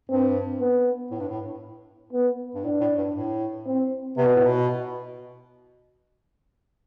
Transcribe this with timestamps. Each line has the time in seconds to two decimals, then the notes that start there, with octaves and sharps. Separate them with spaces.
0.09 G2 C4
0.60 B3
1.11 A2
1.20 G2
1.29 A2
2.13 B3
2.55 G2
2.64 A2 D4
2.81 A2
2.98 G2
3.15 A2
3.66 C4
4.17 C3 B3
4.27 B2
4.36 A2
4.45 B2